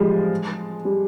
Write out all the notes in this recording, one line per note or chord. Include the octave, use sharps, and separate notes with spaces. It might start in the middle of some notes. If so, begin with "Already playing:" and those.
Already playing: F3 G3 G#3
G3